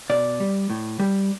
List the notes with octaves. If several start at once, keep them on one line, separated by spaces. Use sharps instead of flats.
B2 D5
G3
A2
G3